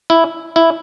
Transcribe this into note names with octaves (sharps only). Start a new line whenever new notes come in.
E4
E4